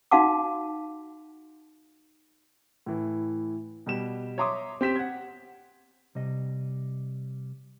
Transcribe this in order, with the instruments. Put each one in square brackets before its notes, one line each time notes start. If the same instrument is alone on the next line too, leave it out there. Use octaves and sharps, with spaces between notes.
[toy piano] D#4 F#4 F5 F#5 A5 D6
[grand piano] A2 E3
B2 G3 G4 E7
C#5 E5 A#5 C6 D6 D#6
C4 G4 B6 E7
F#5 G#6
[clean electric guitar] C3 G3 D#5